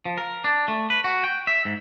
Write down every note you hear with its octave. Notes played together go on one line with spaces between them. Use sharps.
F3
A#4
D4
A3
B4
F#4
G5
E5
G#2